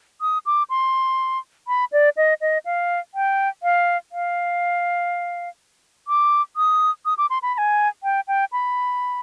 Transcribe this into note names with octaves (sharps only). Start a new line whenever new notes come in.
D#6
D6
C6
B5
D5
D#5
D#5
F5
G5
F5
F5
D6
D#6
D#6
D6
C6
B5
B5
G#5
G5
G5
B5